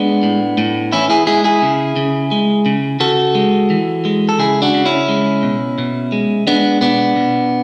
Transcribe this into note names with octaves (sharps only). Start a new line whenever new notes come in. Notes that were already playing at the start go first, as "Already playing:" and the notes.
Already playing: G#3 B3 D4
A2
A2
E3 C#4 E4
E4 G#4
G#3 E4 G#4
E4 G#4
C#3
C#3
G#3
C#3
C#3 F#4 A4
G#3
E3
G#3
A4
C#3 E4 G#4
D4 F#4
C#3
C#4 E4
G#3
B2
B2
G#3
G#3 B3 D4
B2 B3 D4
B2